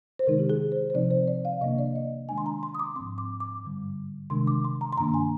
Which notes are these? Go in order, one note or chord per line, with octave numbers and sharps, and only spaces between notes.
C5
C3 D#3 G#3 D#4 A#4
G4
G#4
C5
C5
C3 F3 C4 D#4 D5
C5
D5
F5
C3 D#3 A#3 D4 D#5
D5
D#5
D#3 G#3 D4 G#5
C6
A#5
C6
D#6
D6
G#2 F3 C4 C6
D6
D6
G2 D3 G3
C3 D#3 G#3 D4 C6
D6
C6
A#5
C6
G2 D#3 A#3 D4 A#5
G#5